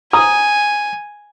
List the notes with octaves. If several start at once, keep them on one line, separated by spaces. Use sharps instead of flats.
G#5 A#5 D#6